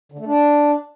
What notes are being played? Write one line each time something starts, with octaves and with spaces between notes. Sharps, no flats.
D3
A3
D4